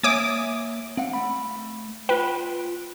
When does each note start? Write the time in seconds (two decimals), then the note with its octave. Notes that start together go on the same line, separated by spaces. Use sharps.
0.03 A#3 C#5 E5 G#5 D6 D#6
0.97 C4 F5 F#5
1.13 A3 B5
2.09 F4 B4 G5